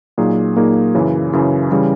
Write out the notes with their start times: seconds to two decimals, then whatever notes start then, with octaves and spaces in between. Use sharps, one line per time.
0.18 A#2 F#3 A#3 D#4 G#4
0.56 A#2 F#3 A#3 D#4 G#4
0.95 F#2 C#3 E3
1.33 F#2 C#3 E3
1.71 C#3 E3 G3